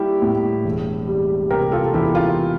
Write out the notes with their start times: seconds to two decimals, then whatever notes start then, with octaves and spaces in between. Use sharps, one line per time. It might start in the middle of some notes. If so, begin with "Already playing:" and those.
Already playing: G3 A#3 E4 G4
0.22 A2
0.64 E1
1.07 G3
1.50 C3 G4 A#4
1.72 F4 A4
1.94 E2 E4 G4
2.15 F4